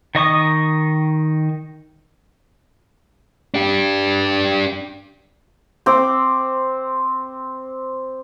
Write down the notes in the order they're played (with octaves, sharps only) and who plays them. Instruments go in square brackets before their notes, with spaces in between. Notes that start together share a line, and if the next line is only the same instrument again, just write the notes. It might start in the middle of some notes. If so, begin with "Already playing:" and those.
[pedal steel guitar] D#3 D#5 C#6 D#6
[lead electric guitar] D4 G4
[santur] C4 D6